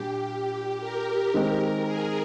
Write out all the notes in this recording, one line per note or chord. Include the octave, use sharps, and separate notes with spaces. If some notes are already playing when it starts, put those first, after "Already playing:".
Already playing: A#2 G3 D4 G4
A#4
D#3 G#3 C4 A#4
G#4